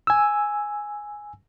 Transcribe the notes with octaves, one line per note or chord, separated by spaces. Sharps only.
G#5 E6